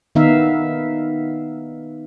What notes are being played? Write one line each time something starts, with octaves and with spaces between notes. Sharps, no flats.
D#3 B3 D#4 E5 F5